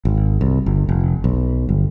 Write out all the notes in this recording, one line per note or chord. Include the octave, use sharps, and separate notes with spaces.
G#1
C2
G1
F1
B1
G1